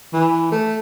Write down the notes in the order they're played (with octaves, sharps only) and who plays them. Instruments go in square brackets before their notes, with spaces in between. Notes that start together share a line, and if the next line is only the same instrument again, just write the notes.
[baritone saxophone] E3
A3